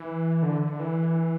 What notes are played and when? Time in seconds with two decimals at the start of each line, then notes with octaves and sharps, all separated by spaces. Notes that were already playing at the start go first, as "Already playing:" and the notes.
Already playing: E3
0.43 D3
0.62 D3
0.80 E3